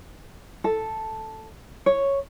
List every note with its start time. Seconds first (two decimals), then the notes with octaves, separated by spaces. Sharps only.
0.64 A4
1.86 C#5